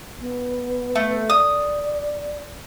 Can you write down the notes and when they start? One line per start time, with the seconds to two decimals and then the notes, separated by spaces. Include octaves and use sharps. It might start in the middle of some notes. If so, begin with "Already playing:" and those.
0.20 B3
0.96 A3
1.30 D5 D#6